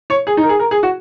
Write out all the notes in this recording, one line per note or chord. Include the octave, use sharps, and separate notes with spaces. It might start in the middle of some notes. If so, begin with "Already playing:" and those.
C#5
G#4
D#4
A#4
G#4
A#4
G#4
F#4